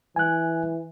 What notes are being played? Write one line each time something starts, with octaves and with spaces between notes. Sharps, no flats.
E3 G#5 F#6